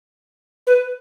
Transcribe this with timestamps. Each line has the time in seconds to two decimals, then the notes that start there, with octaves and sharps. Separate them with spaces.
0.67 B4